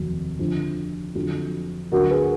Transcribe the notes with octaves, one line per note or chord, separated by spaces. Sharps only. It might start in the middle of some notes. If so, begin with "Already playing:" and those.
Already playing: F1 D#2 D#3 F#3
F2 D3 F3
F2 D3 F#3
D2 D3 F#3 F#4 A#4
G#4 B4